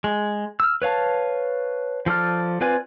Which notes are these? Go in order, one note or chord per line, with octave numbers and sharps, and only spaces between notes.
G#3
E6 F6
B4 C#5 F5 A5
F3 A4 D5 F6
C4 F4 B4 D5 G#5